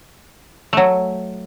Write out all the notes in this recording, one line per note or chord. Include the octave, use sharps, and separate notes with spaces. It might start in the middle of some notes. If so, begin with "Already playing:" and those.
F#3 A3